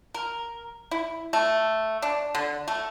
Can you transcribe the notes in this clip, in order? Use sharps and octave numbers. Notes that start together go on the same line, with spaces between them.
A#4
E4
A3
D4
D3
A3